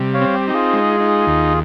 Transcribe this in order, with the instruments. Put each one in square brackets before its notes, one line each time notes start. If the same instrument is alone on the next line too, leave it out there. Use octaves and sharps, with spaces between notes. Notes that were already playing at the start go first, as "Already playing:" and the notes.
Already playing: [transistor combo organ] C3 G3
[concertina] C#5 F5
[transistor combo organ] C4
[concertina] G4
[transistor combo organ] D#4 [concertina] G4
[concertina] F4 G#4
[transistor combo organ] G#3
D#4
D#2